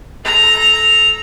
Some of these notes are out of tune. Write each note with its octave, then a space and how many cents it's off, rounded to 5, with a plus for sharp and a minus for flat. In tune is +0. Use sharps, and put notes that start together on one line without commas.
A4 -20 A#5 +0